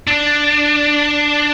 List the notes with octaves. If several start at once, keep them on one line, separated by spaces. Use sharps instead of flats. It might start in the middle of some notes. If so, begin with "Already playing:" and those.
D4